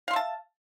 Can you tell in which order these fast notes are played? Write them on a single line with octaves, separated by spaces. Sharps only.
F5 C6 E5 A5